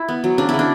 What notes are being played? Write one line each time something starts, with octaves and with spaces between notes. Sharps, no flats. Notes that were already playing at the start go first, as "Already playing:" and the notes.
Already playing: E4
B3
F#3
C#3 D4
E4
C#3 D4